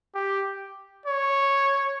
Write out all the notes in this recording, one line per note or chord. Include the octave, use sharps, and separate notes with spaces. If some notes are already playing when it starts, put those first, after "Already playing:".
G4
C#5